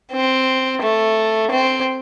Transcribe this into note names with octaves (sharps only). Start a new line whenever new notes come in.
C4
A3
C4